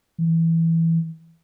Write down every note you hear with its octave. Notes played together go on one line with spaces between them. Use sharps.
E3